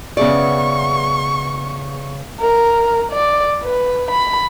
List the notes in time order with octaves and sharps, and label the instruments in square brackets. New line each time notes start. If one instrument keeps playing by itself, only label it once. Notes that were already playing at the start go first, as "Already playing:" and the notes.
[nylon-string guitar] C#3 D5 [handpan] B3 G#4 E5 [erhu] C#6
[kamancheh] A#4
D5
B4
B5